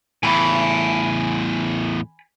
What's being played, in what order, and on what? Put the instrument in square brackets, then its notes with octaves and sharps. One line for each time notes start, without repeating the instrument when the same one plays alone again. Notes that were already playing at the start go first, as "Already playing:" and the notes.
[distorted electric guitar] E2 A2 [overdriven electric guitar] G#5 B5